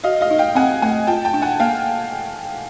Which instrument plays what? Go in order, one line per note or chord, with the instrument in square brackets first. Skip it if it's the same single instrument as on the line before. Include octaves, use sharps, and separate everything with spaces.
[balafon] F#4 [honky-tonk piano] D#5 F5
[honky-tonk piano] D#5 F5
[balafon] D#4
[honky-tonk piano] F5 G5
[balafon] C4 [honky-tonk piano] F#5 G#5
[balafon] A3 [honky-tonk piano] F#5 G#5
[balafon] F4 [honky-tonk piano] G5 A5
[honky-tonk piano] G5 A5
[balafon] D4
[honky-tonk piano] F#5 G#5
[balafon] A#3 [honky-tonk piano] F5 G5